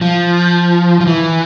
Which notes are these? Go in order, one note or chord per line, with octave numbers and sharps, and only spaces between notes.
F3
F3
E3